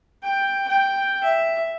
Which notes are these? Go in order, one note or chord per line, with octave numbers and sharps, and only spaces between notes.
G5
G5
E5